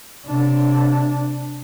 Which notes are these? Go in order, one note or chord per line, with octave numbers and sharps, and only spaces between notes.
C3 D4